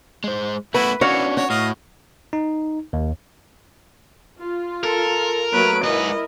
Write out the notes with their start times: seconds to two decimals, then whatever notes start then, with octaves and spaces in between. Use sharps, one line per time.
0.24 G#3 C5
0.74 A3 B3 E4 F#4 B4
1.01 E3 C#4 D4 F#4 C#5 F5
1.37 F#4 C#5
1.50 A2 D#5 F5
2.33 D#4
2.93 D#2
4.41 F4
4.83 A4 A#4
5.53 F#3 A3 A#3 B4 D7
5.84 G#2 E4 A#4 B4 D#5